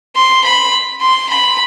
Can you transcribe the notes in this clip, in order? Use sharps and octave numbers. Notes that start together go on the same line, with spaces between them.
C6
B5
C6
B5